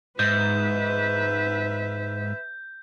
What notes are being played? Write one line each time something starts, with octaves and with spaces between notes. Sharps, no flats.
G#2 B4 E5 G6